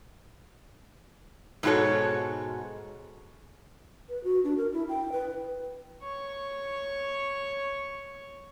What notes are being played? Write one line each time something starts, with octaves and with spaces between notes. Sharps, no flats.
G#2 B2 G#3 F#4 A4 C#5
B4
F#4
D4
A#4
E4
G5
B4
C#5 C#6